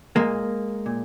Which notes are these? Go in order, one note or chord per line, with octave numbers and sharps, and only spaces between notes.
A#2 G#3 A#3
A#2